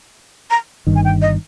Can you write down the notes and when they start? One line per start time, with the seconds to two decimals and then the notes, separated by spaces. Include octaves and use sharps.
0.50 A#5
0.87 G1 G2 D#3
0.96 G#5
1.05 G5
1.22 D#5